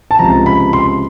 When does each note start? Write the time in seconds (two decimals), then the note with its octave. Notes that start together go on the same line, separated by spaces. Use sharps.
0.11 A5
0.19 C#2 C3 F3 A#5
0.46 B5
0.73 C6